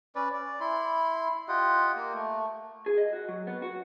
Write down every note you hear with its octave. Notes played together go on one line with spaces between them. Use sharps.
C#4 B4 D5
D5
E4 B5 C6
F4 G4 D#5 F#5
A#3
A3
G#4
D#5
F#4
F#3
B3
F#4